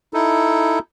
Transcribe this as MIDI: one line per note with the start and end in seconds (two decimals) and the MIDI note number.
0.14 0.79 63
0.14 0.79 64
0.14 0.79 69